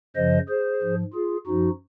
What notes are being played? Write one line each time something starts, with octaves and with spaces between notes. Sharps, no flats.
F#2 C#3 F3 C5 D#5
G#4 C5
G#2 F3
F4 G#4
F#2 F3 D#4 F#4